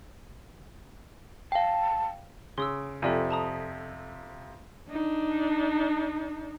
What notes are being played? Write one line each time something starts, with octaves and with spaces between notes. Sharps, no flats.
F5 G5 A5
C#3 C6 D#6 E6
F2 C3 A4 D5 G#5
A5 A#5 D#6
D4 D#4